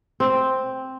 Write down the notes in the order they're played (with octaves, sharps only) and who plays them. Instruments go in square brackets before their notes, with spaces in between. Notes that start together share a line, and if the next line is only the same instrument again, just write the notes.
[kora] C4